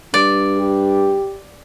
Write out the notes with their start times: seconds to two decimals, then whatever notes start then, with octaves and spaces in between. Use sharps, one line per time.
0.14 G2 D5
0.58 G4